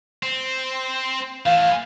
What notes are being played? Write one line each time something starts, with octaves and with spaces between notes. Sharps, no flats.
C4
E3 A3 F5